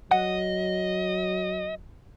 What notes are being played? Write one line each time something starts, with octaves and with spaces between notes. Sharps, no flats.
F#3 D#5 F#5